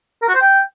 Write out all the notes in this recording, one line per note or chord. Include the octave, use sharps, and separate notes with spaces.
A#4
F#4
C5
G5